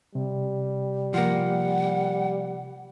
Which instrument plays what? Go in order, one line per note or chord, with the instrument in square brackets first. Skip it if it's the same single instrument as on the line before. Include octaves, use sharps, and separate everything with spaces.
[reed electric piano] C3 [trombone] G3
[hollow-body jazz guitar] F3 A#3 [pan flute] F#5